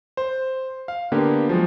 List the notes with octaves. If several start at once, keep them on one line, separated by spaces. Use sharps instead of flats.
C5
F5
D3 A#3 B3 G4
F3 F#3 G#3